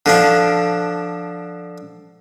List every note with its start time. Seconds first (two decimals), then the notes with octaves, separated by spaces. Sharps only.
0.06 D3 F3 D4